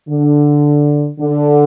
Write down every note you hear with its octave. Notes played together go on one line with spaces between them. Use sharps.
D3
D3